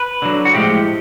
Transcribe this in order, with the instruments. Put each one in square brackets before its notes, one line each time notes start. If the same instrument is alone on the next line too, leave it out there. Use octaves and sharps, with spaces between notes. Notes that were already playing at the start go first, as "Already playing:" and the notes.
Already playing: [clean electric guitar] B4
D3 F#3
F#4
A2 F3 G#3 G4